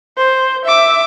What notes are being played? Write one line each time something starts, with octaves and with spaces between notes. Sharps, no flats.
C5
E5 D6